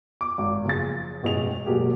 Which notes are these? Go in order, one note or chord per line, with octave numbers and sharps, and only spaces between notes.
D6
G#1
F#1 F3 F4 G#4 A6
E1 A1 A2 G#4 D#5 F7
E1 F#3 A#3 G4 G#4